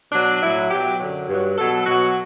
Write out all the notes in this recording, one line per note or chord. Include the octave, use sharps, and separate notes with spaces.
B2 F#3 D4
A2 F#3 E4
B2 F#3 G4
F#2 D3 F#3
G2 F#3
B2 F#3 A4
B2 F#3 F#4